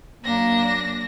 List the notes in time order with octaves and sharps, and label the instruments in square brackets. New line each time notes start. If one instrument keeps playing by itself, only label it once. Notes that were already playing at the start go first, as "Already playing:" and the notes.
[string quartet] F#2 D4 A#6 [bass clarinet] A#3